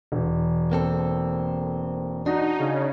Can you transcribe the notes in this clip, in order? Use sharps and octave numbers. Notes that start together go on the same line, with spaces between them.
E1
A#3 C4 A4
D4 D#4 F#4
C#3